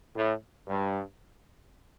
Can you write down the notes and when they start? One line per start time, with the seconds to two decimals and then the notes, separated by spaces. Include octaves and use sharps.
0.15 A2
0.67 G2